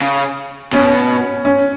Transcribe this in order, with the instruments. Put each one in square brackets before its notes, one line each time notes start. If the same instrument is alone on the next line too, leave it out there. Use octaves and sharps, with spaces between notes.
[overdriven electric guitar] C#3
[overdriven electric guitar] B2 [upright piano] C#4
[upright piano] C#4